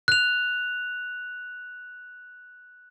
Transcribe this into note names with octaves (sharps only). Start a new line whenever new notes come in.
F#6 F7